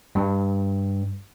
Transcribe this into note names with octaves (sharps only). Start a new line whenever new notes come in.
G2